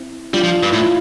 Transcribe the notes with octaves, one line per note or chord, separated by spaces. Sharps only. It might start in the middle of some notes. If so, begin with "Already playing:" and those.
Already playing: C4 E4
G3 D4 F4
F3
G2
A2 E4
F4